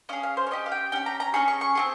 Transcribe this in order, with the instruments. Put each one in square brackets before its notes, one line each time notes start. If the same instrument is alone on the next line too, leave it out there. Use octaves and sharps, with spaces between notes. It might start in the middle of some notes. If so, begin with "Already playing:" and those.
[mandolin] C#4 G#4 F5
F5
C5
C#5
C#4 G4 D#5
F5
G5
C#4 G4 G5
A#5
A#5
C#4 G#4 C#6
C#6
C#6
C4 F4 G#4